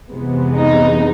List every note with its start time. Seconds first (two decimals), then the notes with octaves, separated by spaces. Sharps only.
0.11 F2 C3 E3 G#3 B3
0.57 D#4